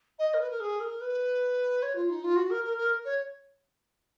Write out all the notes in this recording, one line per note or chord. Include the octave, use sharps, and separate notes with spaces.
D#5
A#4
B4
A#4
G#4
A#4
B4
C#5
F4
D#4
F4
F#4
A#4
A#4
A#4
C#5